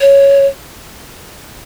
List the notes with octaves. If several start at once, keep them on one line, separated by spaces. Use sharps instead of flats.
C#5